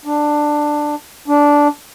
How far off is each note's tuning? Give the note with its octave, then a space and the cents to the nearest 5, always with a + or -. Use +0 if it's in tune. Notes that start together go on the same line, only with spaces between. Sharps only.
D4 +10
D4 -10